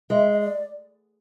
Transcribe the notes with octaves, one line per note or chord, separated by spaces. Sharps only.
G#3 E5
D#5
D5